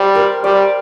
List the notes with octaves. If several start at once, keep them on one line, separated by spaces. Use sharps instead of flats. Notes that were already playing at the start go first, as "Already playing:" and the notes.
Already playing: G3 C5
A#4
G3 D5